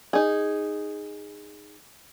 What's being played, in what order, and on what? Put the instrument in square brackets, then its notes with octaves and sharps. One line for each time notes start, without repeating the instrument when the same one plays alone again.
[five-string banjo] D#4 G#4